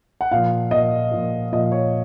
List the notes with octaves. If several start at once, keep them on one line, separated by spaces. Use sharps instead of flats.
F#5
A#2 F3 F5
A#2 F3 D#5
A#2 F3
A#2 F3 D#5
C#5